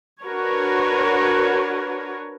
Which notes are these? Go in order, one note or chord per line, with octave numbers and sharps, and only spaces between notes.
D4 F#4 A#4 B4 C#5